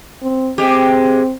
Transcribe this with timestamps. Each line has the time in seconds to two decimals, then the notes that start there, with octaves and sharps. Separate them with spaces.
0.22 C4
0.58 G#3 C4 G4